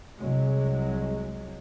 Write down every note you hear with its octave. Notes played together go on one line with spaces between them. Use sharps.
C2 F#3 G#3